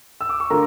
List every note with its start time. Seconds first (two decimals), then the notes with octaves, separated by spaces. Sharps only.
0.21 E6
0.29 D6
0.40 C#6
0.50 D3 A3 D4 F4 A#4 A#5